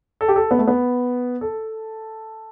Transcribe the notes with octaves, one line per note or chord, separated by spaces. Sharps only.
A4
G4
A4
B3
A3
B3
A4